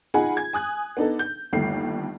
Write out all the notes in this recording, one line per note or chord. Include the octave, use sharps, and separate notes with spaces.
D#4 F4 G#4 F#5 G#5 B5
G#6
G#5 D#6 F#6 G#6
B3 D4 D#4 A4
G6
G1 D#2 A3 C7